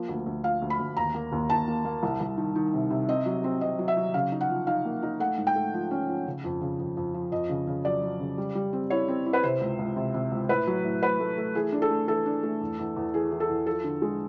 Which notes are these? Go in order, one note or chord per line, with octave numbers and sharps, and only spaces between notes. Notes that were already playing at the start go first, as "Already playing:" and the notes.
Already playing: F3 A#3
D2
D2
F3 F5
D2
B5
D2
D#2 A#5
A#3
D#2
D#2 A5
A#3
A#3
C2
C2
D#3
D#3
C3
C3
C4 D#5
F#3
C4
C4 D#5
F#3
E5
F#3
C#3 F5
D#4
F#5
F3
D#4 F5
A#3
D#4
A3 F#5
G#2
G5
A3
F3
C#4
F3
C#3
F2
C#3
F2
F2
F3
F2 D#5
C#3
C#3
F#3 D5
F#3
C#3
G3
G3
C4
E4 C#5
C4
E4
B4
C3 C5
C#2
C#2
C3
C3
C#2
A2 B4
F#3
A2
A2 B4
A3
A3
E3 G#4
D4
A4
A3
E3 A4
D4
A3
E2
E2
E2
E3 G#4
E3
A4
E2
F3 A4
D3
G#3